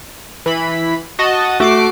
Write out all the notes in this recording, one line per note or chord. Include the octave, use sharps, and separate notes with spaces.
E3 B5
F#4 D#5 A5
A3 F#4 D6 C7